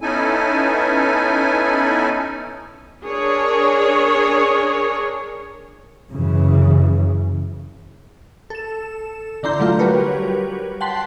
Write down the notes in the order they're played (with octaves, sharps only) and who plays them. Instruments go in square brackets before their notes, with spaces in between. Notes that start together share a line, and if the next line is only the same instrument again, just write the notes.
[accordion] B3 C#4 D#4 E4 A4 G#5
[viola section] D4 G#4 A#4 C#5
[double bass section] F#2 C#3 E3
[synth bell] A4 E7
D3 D4 E4 A#5 C6 G6
F#3 A3 D4 F4
G3 F#4 G4 A#4 B4 C#5
F#5 G5 A5 C6 B6